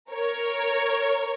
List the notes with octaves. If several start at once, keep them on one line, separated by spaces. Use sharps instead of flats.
A#4 C#5